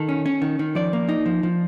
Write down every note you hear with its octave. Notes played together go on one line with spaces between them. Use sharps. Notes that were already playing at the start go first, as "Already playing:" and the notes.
Already playing: D#3 A4
C#4
C#4
D#3
D#3
F3 D5
A#3
D#4
F3
F3